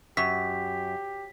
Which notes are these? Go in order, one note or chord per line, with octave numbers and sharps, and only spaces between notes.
F#2 G4 B6